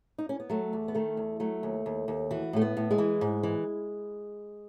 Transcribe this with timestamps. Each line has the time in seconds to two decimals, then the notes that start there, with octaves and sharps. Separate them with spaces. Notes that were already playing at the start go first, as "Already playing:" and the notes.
0.18 D#4
0.29 C#4
0.40 B3
0.50 F#3 A3
0.73 E2
0.88 B3
0.95 D#3 A3
1.17 E2
1.40 F#3 A3
1.63 D#2
1.86 D#2
2.08 D#2
2.31 E3 F#4
2.53 A2 A3
2.61 B3
2.77 A2
2.91 G#3
2.98 E3
3.21 G#2
3.43 E3